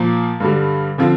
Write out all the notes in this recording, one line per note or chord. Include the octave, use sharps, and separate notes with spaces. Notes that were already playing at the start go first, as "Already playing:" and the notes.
Already playing: A#2 F3 A#3
G2 D3 G3
D3 F3 C4 F4